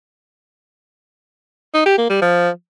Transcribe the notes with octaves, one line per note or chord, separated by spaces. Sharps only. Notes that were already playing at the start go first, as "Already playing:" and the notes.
D#4
G4
A#3
G3
F3